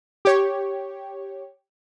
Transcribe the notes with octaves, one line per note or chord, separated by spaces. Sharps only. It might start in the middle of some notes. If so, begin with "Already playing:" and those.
G4 C#5